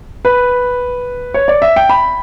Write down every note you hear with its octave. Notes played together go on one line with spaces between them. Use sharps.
B4
C#5
D5
E5
G5
B5